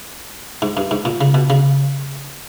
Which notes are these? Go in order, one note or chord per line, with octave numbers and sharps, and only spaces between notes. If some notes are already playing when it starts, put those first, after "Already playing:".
G#2
G2
G#2
A#2
C#3
B2
C#3